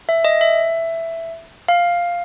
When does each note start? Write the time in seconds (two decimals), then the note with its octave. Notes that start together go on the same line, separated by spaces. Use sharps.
0.09 E5
0.25 D#5
0.41 E5
1.68 F5